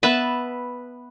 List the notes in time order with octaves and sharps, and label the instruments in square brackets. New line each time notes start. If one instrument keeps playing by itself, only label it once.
[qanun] B3 A5 [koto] B4 E5